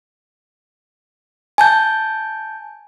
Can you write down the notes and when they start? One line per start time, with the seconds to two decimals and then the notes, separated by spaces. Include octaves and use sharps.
1.58 G#5 A5 G6